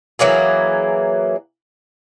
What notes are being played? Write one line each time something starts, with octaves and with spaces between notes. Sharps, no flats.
E3 F#3 A#3 G#4